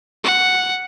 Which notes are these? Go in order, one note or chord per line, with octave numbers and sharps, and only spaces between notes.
F#5